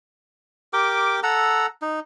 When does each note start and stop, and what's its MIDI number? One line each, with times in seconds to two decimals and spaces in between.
0.73 1.20 67
0.73 1.20 70
0.73 1.20 79
0.73 1.20 86
1.23 1.66 69
1.23 1.66 78
1.23 1.66 82
1.23 1.66 88
1.82 2.00 63